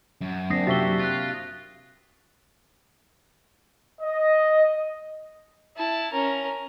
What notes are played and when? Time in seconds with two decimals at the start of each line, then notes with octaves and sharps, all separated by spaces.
0.21 F#2
0.50 A#3 C4 D4 D#6 A#6 C7
0.67 C3 F3 F#4 G4 E5 A6 B6 G7
0.99 F4 F#6 A6
4.02 D#5
5.77 E4 A5
6.13 C#4 A#4